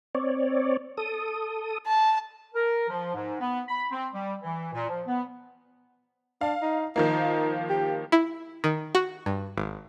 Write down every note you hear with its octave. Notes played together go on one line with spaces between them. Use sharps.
C4 C#5 D5
A4 D#6
A5
A#4
F3
G#2
B3
B5
C4
G3
E3
A#2
F3
B3
D4 F5
D#4
D#3 F3 A#3 D#4
G4
E4
D#3
F#4
G2
G#1